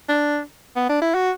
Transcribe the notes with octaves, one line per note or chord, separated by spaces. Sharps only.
D4
B3
D4
E4
F#4